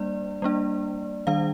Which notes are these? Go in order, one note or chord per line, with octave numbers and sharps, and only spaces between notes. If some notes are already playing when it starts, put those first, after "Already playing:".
Already playing: G3 A#3 D4 D5
G3 A#3 D4
D#3 G3 D4 F5